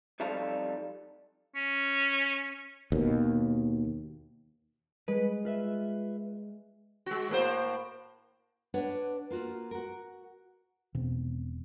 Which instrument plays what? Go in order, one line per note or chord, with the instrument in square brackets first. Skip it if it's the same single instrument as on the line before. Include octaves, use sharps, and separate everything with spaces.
[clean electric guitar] F2 G3 D#4 A4 F5
[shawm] C#4
[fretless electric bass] D#2 B2
[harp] G#3 [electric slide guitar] B4
[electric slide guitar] F4 B4 E5
[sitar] G#3 F#4
A2 A#3 C5
[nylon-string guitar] D4 B4 C#5 F#5
A#3 F4 F#4
F#4 A#4
[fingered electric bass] E1 B2 D#3 C4